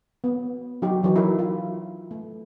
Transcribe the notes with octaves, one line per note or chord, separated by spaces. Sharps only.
B3
F#3 D#4 F#4 G4
E3 F#3 D#4
E4 A#4
F4
A3